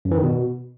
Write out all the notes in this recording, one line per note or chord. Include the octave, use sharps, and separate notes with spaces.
F#2
E3
D#3
B2